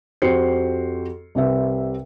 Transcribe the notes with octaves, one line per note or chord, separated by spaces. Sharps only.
F2 F#4 G4 C5 C7 C#7
C2 C3 B4 E5